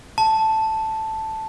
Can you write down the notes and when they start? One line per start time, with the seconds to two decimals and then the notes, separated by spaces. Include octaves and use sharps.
0.18 A5